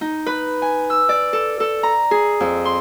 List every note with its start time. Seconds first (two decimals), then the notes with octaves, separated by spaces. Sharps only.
0.01 D#4
0.26 B4
0.62 G#5
0.90 E6
1.09 D5
1.33 A4
1.60 A4
1.83 A#5
2.11 G#4
2.40 F2
2.65 C6